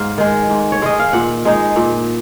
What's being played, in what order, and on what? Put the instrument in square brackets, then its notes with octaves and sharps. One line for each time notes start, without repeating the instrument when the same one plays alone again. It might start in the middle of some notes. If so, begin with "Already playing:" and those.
Already playing: [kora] G#2 F5
D#3 G#3
G#2
C#5
D#3 G#3 D#5
F5
A#2 F#5
G#3 D#4
A#2